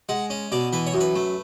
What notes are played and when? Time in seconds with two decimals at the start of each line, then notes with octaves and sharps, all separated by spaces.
0.09 G#3 F#5
0.30 C#4
0.52 B2 D5
0.73 E3 B4
0.87 C#5
0.94 F#2
1.00 B4
1.15 A3